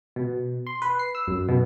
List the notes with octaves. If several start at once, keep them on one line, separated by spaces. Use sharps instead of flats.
B2
C6
B4
C7
E6
F#2
B2